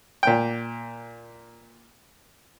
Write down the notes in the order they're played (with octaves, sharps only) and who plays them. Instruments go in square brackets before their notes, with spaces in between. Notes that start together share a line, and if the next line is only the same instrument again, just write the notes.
[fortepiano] A#2 G5